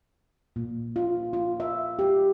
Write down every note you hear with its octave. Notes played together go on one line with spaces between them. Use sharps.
A#2
F4
F4
E5
G4